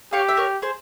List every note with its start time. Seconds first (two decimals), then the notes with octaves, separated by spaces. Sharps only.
0.13 G4 C#5 F5
0.29 E5
0.37 A#4 C#5
0.62 G#4 C5